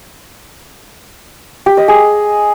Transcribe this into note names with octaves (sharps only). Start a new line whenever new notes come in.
G4
D#5
G#4